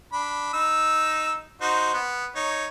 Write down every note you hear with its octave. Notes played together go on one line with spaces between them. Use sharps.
D4 B5
D#4 E6
D#4 F#4 C5
B3
D#4 C#5